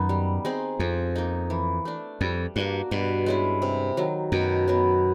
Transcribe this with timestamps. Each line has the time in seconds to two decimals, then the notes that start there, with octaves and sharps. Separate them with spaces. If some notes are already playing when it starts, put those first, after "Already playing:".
Already playing: F#2 D#3 B3 D#4
0.09 G3
0.45 C4 D#4 G#4
0.79 F2 F3
1.16 A#3 D#4
1.50 E3
1.85 A3 D4
2.21 F2 G3
2.56 G2 A#3 D4 F#4
2.91 G2 B2
3.26 G#3 C#4 E4
3.62 C3
3.97 D#3 F#3
4.32 F#2 B2
4.68 F#3 B3